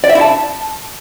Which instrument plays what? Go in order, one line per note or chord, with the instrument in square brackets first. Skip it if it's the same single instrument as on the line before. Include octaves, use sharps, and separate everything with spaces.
[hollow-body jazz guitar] D5
E5
E4
A5